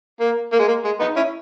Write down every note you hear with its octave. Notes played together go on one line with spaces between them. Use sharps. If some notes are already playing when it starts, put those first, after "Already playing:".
A#3
A#3
G#3
A#3
G#3
B3 D#4
C#4 E4